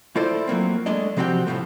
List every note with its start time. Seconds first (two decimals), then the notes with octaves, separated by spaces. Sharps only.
0.16 A3 E4 F4 A4 C5 D5
0.47 F#3 A3 A#3 C4
0.86 G#3 A3 D4 D5 D#5
1.17 C3 F3 C4 F#4 G4 G5
1.46 C2 A2 C3 F3 A3